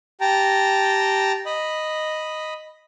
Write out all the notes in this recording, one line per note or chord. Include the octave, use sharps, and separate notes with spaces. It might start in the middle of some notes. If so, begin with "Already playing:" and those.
G4 G5 A5 A#5
D#5 B5